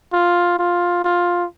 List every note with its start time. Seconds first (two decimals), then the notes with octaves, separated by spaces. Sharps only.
0.13 F4
0.59 F4
1.04 F4